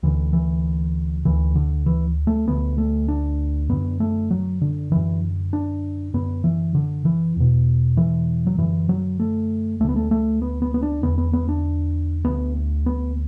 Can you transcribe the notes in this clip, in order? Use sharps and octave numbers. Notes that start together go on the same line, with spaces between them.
D2 D3 E3
E3
D2 D3 E3
D3
E3
A3
D2 D3 B3
A3
D4
F#2 D3 B3
A3
F#3
D3
F#2 D3 E3
D4
F#2 D3 B3
E3
D3
E3
E2 B2
E3
F#3
F#2 D3 E3
F#3
A3
D2 D3 A3 B3
A3
A3
B3
B3
B3
D4
E2 D3 B3
B3
B3
D4
D2 D3 B3
B3